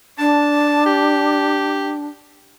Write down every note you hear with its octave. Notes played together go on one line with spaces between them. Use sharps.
D4 A5
G4